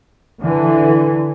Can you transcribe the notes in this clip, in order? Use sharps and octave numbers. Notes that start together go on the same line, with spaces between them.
D3 E3